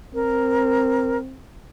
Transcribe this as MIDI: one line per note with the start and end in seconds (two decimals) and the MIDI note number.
0.14 1.39 60
0.14 1.18 70